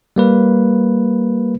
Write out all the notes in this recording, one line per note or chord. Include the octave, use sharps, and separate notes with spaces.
G3 A#3 B4